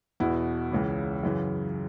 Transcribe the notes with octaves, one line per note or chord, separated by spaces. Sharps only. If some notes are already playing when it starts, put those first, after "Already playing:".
E2 B2 E4
C#2 C#3 E3
F#2 C#3 E3